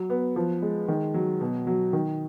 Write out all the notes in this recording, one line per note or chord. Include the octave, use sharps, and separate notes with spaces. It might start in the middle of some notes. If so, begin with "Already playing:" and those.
Already playing: F#3
B3
F3
G#3
D#3
F#3
B2
F#3
D#3